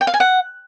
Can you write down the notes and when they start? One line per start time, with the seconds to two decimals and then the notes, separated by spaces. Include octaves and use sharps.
0.01 G5
0.07 F5
0.14 G#5
0.20 F#5